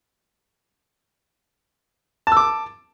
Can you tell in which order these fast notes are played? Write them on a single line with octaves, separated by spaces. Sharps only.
A5 E6 D6